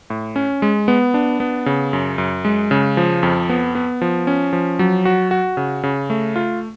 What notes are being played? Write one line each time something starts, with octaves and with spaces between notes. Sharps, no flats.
A2
C#4
G#3
B3
D4
B3
C#3
F#2
F#2
G#3
C#3
F3
F2
B3
B3
F3
C#4
F3
F#3
F#4
F#4
C#3
C#3
A3
F4